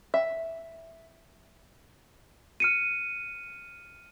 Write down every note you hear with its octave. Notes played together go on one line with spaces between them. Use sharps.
E5
F6 C#7 D#7